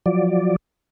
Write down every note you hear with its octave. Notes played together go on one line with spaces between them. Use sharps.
F3 F#3 D5